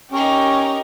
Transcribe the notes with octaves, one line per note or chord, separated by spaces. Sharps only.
C#4 D#4 G4 A#4